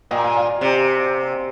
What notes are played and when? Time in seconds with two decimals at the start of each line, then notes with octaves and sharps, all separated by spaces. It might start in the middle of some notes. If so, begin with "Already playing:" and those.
0.11 A#2 D#5 G5
0.18 A#5
0.23 F5 G#5
0.36 D5 F5
0.49 D5
0.61 C3 D5